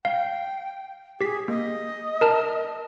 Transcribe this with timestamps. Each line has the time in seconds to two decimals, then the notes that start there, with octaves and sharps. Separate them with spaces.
0.05 F5 G5
1.21 G4 G#4 B6
1.48 A#3 D#5
2.21 A#4 A5 F6